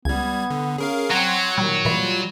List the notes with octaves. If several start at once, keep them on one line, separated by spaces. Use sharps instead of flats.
C#2 G3 B3 G#6
D3
C#4 G#4 A#4 F5
F#3 C4 F#5 A#5 C6 G#6
A#2 D#3 G3
A#2 E3 G3 F4 B5